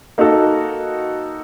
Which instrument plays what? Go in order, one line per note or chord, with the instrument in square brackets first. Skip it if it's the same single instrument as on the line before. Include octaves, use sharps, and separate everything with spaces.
[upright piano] A#3 D#4 F#4 A4